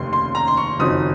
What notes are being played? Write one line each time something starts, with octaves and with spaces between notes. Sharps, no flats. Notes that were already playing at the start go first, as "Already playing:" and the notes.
Already playing: F1 D#2 C#3 A3 C6
C6
A#5
C6
C#6
F#1 F2 D#3 F#3 C4 D#6